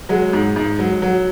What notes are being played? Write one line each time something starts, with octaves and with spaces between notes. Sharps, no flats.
F#3 G#3
G#2
G#2
F#3
F#3